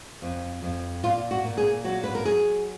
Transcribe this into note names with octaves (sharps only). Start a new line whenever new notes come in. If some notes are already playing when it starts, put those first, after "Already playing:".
F2
F2
A#2 F4
F#4
A#2
G#4
F#3 F#4
B4
A#4
F#3 G#4